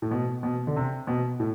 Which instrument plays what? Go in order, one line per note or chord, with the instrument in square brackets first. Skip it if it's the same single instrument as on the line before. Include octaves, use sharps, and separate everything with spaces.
[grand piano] A2
B2
B2
D3
C3
B2
A2